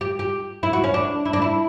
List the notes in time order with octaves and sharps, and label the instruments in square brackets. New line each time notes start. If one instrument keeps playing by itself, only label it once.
[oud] G4
G4
E4
F#4
C#4
D4
E4
D4
E4